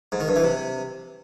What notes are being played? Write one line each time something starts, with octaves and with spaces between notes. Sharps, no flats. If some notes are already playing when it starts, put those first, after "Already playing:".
G#2
D#3
G2
E3
C3